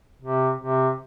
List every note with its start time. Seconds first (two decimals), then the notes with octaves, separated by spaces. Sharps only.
0.22 C3
0.61 C3